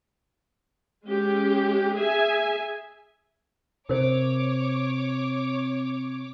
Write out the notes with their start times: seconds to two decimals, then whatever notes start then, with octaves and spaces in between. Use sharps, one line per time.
1.06 G#3 C#4 G4
1.95 G#4 E5 G#5
3.89 C3 A#4 C5 C#5 D6